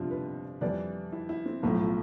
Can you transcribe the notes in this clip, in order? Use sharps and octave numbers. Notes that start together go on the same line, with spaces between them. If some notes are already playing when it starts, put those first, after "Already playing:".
Already playing: G1 F2 C3 C4 D4 F4
B4
F2 E3 G3 D5
E4
E4
C4
B1 A2 F3 A3 E4
F4